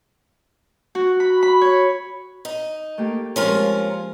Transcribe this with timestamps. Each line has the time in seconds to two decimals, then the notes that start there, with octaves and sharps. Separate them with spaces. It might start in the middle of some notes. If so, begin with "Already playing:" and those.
0.95 F#4
1.20 B5
1.43 B5
1.61 C#5
2.45 D#4
2.98 A3 A#3 G4
3.36 F3 G#3 C4 C#4 F4 A#4